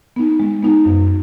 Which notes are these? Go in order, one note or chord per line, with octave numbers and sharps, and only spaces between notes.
B3 D#4
G#3
B3 D#4
F#2